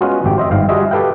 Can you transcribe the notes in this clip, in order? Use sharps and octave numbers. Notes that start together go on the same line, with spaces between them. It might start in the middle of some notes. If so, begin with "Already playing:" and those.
G#3 B3 C#4 F4 F#4
G#1 F2 G4 G5
C5 D#5 E5
G1 G#2 F5 G5
G3 F4 F#4 G#4 D#5 E5
G4 A4 B4 F5 G5